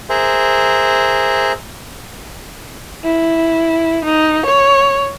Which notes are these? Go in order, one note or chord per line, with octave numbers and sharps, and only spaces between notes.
G#4 A#4 C5 E5
E4
D#4
C#5